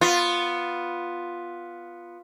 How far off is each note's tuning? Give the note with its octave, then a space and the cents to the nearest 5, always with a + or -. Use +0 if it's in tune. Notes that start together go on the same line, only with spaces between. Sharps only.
B3 +0 F4 +0